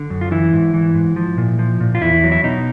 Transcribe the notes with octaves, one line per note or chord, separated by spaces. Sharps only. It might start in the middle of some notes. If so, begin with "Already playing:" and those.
Already playing: D3
F#2
F4
E3 E4
G#2
E3
G#2
F3
A#2
F3
A#2
F4
E2 E4
F#3
E4
B2 D#4